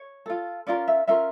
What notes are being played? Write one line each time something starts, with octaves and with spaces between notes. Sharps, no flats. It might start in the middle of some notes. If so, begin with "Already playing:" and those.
Already playing: C#5
F4 A4
C#4 F4 A#4 D5
E5
C#4 F4 A#4 E5